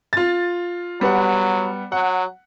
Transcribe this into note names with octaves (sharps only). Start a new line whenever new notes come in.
F4 A6
F#3 G3 B3 F#5
F#3 F#5